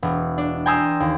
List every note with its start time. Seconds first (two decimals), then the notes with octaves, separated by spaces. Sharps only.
0.03 E1
0.38 D4
0.66 G5 G#5 A#5 C6 D#6 E6
1.00 D#2